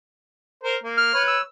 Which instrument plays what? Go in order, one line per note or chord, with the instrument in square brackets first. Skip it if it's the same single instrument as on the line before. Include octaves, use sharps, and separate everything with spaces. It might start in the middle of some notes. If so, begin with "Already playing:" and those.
[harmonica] A#4 C5
A#3
[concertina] F6
[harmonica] B4 C#5
[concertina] E6